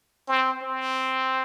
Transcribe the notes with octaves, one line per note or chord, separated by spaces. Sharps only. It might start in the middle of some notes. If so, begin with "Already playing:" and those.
C4
C4